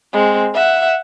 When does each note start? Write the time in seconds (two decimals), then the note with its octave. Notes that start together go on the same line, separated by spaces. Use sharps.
0.13 G#3 C4
0.55 E5 F#5